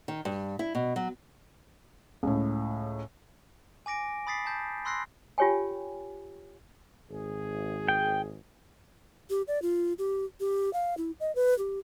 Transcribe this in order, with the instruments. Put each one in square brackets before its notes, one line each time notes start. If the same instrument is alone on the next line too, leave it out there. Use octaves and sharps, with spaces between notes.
[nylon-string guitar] D#3
G2
E4
B2
F#3
[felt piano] C#2 A2
[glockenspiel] G#5 D6 A#6 D7
B5 D#6 A6 B6 C7
A5 G6
B5 C6 E6 F#6 A#6 C7
[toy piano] F4 G4 C#5 G5 G#5
[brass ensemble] G#1 G#4
[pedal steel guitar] G5
[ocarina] G4
D5
F4
G4
G4
F5
E4
D#5
B4
G4